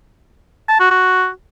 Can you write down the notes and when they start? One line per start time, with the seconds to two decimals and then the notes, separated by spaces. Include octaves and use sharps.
0.69 A5
0.80 F#4
0.91 F#4